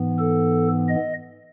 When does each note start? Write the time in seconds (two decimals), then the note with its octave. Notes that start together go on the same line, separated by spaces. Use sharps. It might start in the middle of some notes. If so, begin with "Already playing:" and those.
Already playing: G#2 E3 B3
0.19 A4
0.88 D#5